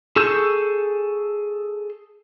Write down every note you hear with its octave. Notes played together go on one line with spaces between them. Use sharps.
G#4 A4 C#6 E6 G6